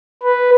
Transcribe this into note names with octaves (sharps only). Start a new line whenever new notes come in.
B4